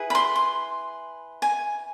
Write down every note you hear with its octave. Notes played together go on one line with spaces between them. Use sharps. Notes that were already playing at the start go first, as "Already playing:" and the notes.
Already playing: E4 G#4 B4
B5
C6
C6
G#5